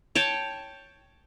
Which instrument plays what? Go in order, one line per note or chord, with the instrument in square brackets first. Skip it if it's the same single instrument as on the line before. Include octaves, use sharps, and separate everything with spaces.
[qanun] C#5 G5 A5